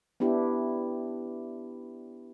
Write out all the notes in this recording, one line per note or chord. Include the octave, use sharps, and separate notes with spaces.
B3 D4 E4 G4